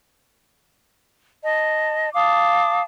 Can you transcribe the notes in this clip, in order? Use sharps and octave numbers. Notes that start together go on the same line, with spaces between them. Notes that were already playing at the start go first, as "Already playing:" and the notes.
D#5 A5
F5 A5 D6 D#6